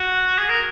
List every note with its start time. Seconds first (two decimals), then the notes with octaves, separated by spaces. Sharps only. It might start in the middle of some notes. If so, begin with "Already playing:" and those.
Already playing: F#4
0.39 G#4
0.49 A#4